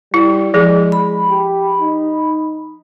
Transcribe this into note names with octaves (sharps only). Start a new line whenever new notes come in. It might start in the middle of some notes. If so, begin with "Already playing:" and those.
G3 E4
F3 G#3 G#4
B5
G4
D#4